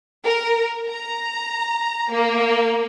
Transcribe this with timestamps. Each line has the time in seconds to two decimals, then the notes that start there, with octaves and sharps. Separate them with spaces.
0.25 A#4
0.89 A#5
2.11 A#3